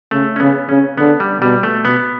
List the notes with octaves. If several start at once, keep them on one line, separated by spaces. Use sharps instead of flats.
C#3 A3
C#4
C#3 B3
C#3 C#4
D3 B3
G3
B2 G3
A3
B2 B3